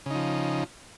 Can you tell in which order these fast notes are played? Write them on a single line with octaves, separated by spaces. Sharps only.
C#3 D#4 F3